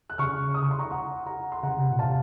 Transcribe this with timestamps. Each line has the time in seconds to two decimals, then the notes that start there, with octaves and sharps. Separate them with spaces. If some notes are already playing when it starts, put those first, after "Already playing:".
0.10 F#6
0.18 C#3 C#6 F6
0.54 D#6
0.63 C#6
0.71 C6
0.79 A#5 C#6
0.91 F#5 A#5
1.26 F#5 A#5
1.52 C6
1.63 C#3 F#5 A#5
1.77 C3
1.91 A#2
1.99 F5 A5
2.04 C3